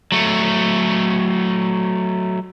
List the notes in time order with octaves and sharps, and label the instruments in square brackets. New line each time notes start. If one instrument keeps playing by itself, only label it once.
[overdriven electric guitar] F#3 A3